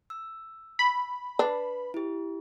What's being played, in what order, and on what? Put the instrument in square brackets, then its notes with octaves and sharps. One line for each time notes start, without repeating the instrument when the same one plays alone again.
[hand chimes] E6
[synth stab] B5
[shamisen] D4 [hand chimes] B4
[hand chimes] E4 G4